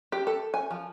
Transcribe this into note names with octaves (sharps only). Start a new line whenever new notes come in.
G4
A4
G#5
F3